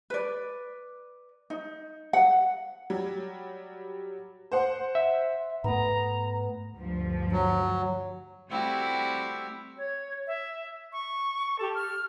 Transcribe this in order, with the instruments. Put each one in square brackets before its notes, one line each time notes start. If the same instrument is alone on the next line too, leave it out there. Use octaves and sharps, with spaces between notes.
[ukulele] B4 D5
D#4
F#5
[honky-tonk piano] F#3 G3
C5 F#5 C6
[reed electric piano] E5
[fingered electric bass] G#2 A3 [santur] B3 [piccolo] A#5
[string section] D2 G2 F3
[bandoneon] F#3
[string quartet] G3 A3 C4 E4 F#4 G4
[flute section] C#5
E5
C#6
G4 A4
F6